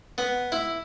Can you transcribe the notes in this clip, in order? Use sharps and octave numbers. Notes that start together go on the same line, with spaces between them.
B3
E4